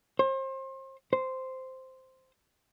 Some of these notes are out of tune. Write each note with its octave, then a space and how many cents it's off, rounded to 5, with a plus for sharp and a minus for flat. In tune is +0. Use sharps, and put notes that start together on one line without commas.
C5 +35
C5 -5